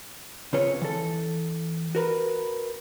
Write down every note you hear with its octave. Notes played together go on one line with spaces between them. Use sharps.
C#3 C4 F4 B4 C#5
E3 A4
F#4 A#4 B4